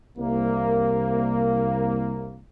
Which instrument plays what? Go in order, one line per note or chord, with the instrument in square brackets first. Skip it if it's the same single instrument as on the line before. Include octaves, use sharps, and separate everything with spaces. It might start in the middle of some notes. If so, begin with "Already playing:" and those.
[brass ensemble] C2 A#3